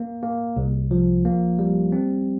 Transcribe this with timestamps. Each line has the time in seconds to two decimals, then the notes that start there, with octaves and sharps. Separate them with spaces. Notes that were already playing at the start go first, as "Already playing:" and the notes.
Already playing: A#3
0.23 A#3
0.56 C2
0.91 F3
1.25 A#3
1.59 G3
1.92 C4